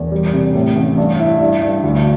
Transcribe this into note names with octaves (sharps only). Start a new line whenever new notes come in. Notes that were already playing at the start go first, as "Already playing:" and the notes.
Already playing: E1 E2
G3
C3
A2
A1
G2
E4
G2
G2
D2